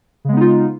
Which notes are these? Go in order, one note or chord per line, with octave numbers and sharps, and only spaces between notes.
C#3 G#3 B3 D#4 F4